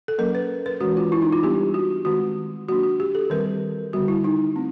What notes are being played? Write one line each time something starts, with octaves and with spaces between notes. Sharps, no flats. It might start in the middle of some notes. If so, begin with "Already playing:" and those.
A4
F#3 A#3 C#4 A#4
B4
B4
E3 G#3 C#4 F#4
F4
E4
D#4
F4
G3 B3 D4 G4
F#4
D#3 G#3 C4 F#4
F#3 A#3 D4 F#4
F#4
G4
A4
D#3 G3 C4 A#4
D3 G3 B3 F#4
E4
D#4
A3 C4